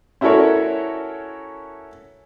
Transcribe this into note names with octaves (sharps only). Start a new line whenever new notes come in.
C#4 E4 F#4 A4 A#4 C#5